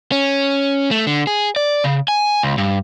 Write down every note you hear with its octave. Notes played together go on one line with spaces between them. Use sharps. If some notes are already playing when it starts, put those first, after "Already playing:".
C#4
A3
D3
G#4
D5
C#3
G#5
C#2
G2